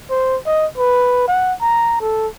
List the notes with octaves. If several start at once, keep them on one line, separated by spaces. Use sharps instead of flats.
C5
D#5
B4
F#5
A#5
A4